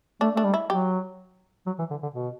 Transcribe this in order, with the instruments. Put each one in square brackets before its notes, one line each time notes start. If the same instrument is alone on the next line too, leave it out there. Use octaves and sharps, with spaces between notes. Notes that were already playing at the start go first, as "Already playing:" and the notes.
[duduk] A3 [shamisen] D4
[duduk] A3 [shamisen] D4
[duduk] G3
[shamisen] E4
[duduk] F#3 [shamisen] G4
[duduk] F#3
E3
D3
D3
B2